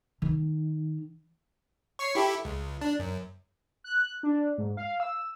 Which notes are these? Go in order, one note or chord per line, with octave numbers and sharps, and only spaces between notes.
D#3
C#5 C#6 C7
E4 G4 A4
C#2
D4
F#2
F#6
D4
G#2
F5
E6